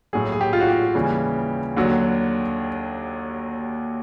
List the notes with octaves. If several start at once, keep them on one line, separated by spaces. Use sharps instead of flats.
A#1 A2 F#3 G#4
G#4
G4
F4
F#4
G4
D#2 C#3 E3 G3
D#2 D3 F#3